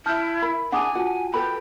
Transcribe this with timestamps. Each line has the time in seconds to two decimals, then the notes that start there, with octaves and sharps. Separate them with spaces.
0.06 E4 A5 F6 G6
0.42 A#4 B5
0.72 D4 E4 G#4 F#5 G#5 D6 D#6
0.95 F4 F#4 F#5 A5
1.34 A4 B4 G5 B5